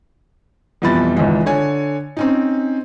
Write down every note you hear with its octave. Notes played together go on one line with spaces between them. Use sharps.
F2 B2 E3 G3 B5 A6
G#1 C#2 E3 G#3
D3 C#5 G#5
C4 C#4 D#4